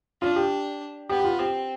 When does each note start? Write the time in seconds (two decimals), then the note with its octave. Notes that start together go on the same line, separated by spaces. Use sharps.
0.21 D4 F4
0.36 G4
1.09 B3 G4
1.20 G4
1.24 F4
1.39 C4 G4